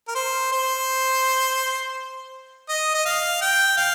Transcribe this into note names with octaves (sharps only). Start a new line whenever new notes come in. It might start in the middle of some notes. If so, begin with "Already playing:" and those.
A#4
C5
C5
D#5
D#5
F5
G5
F5